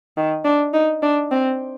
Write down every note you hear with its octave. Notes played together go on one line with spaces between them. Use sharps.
D#3
D4
D#4
D4
C4